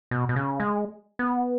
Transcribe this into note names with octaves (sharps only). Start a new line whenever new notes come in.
B2
B2
C#3
G#3
B3